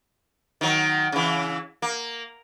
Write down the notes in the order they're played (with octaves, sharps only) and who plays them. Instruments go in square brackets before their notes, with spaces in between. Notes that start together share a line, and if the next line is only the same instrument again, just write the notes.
[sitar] D#3 F#3
C#3 E3
A#3